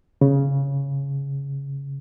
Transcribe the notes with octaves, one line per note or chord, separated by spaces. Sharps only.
C#3